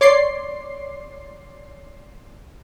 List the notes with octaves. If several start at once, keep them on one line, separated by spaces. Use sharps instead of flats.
C#5 D5 C6 D6 C7